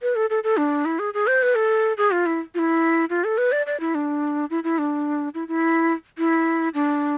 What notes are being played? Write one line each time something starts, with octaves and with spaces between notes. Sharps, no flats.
B4
A4
A4
A4
D4
E4
G#4
G#4
C5
B4
A4
G#4
F4
E4
F4
E4
F4
A4
B4
D5
D5
E4
D4
E4
E4
D4
E4
E4
E4
D4